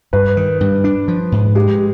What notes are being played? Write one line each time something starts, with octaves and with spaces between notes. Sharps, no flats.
G2 B4
D#3
G2
D4
F3
G#2
G#3 G4